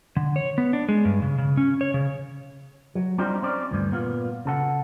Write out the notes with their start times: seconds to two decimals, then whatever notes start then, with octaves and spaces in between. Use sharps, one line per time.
0.16 D3
0.36 C#5
0.58 B3
0.73 D4
0.89 G#3
1.05 G2
1.22 C#3
1.38 C#3
1.57 C#4
1.81 C#5
1.94 C#3
2.95 F#3
3.18 G3 C4 D4 D#4 F4 G4
3.42 C4 C#4 D5
3.71 D2 G2 E3
3.91 A#2 B3 F4
4.45 C#3 A4 F#5